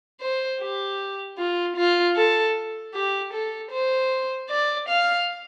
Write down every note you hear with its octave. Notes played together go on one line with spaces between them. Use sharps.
C5
G4
F4
F4
A4
G4
A4
C5
D5
F5